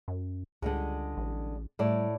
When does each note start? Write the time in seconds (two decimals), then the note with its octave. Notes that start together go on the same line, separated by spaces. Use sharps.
0.08 F#2
0.62 C#2 D3 G3 G#3
1.17 A1
1.79 A2 G3 E4 D5